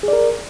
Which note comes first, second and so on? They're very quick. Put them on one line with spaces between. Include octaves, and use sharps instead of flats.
G#4 D5 A#4